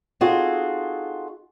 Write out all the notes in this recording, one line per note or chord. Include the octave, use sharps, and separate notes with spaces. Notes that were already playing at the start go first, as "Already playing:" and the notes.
C4 D#4 F4 F#4 G#4 A4